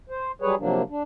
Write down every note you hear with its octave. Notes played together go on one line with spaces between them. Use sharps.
C5
F#3 G3 G#4 B4 C#5
C3 F3 F#3 A#3 D4
D4